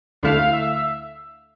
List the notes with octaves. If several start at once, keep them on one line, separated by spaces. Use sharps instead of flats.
D2 D3 A3 E4 F5
E5